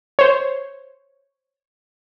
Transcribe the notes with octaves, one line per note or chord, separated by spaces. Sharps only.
C5 C#5